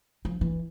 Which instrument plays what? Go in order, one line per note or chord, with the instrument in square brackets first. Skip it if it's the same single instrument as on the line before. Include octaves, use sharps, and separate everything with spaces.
[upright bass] F3
E3